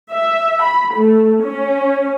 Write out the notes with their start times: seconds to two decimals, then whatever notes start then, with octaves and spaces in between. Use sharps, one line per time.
0.11 E5
0.62 B5
0.95 A3
1.44 C#4